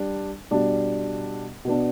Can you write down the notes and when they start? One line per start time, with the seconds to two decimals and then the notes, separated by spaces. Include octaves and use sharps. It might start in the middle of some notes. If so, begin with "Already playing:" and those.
Already playing: G3 D4
0.51 B2 G3 D4
1.65 B2 B3 D4